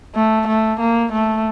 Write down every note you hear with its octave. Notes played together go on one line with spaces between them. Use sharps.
A3
A3
A#3
A3